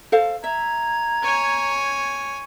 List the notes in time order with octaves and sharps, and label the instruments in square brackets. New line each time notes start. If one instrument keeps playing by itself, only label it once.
[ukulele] A4 C5 F5
[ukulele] E5 [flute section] A#5 G#6
[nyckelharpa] C#5 G#5